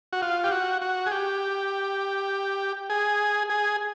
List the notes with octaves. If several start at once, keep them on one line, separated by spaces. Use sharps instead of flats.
F#4
F4
G4
F#4
F#4
G#4
G4
G#4
G#4